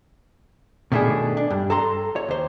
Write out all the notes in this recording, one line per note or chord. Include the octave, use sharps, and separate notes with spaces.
B2 D#3 A3 D4 G#4
D4
G2
A4 A#5 C6
C#5
D#2 C5